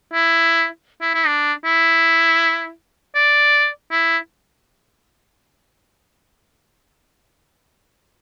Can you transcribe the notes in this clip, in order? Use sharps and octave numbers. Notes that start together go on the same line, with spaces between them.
E4
E4
E4
D4
E4
D5
E4